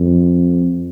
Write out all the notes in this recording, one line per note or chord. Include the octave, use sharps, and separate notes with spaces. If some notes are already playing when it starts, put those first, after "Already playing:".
Already playing: F2